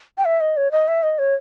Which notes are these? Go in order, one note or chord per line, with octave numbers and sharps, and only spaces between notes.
G5
E5
D#5
C#5
D#5
E5
D#5
C#5